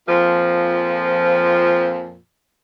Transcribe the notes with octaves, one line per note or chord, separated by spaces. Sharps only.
F2 A#2 F3